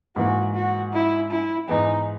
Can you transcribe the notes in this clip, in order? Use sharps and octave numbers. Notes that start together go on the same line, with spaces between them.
G#2 E3 A#3 F#4
F#4
E4
E4
G#2 E3 G#3 B3 D#4